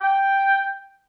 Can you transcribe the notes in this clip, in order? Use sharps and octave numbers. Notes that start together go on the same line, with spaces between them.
G5